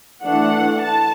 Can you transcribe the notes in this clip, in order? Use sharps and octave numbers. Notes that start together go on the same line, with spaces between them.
E3 A3 D4 F#5
A5